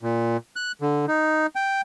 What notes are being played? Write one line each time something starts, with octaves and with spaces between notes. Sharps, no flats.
A#2
F#6
D3
D#4
G5